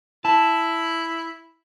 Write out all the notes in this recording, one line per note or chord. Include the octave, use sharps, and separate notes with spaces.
E4 A5